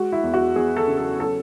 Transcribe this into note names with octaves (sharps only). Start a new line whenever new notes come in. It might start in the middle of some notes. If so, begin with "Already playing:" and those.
Already playing: G#3 F#4
E4
E2
F#4
E2 G#4
A4
C#3
A4
F#3 A4